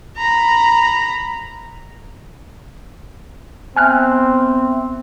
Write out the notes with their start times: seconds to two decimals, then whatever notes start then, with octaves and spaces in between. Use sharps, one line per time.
0.17 A#5 B5
3.76 B3 C4 E5 G#5 F6 F#6